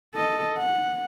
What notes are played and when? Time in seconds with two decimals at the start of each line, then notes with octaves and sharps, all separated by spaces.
0.14 A4 D#5
0.58 F#5